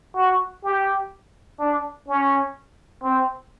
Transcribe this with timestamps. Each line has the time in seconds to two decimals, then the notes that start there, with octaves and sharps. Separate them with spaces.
0.16 F#4
0.63 G4
1.60 D4
2.08 C#4
3.04 C4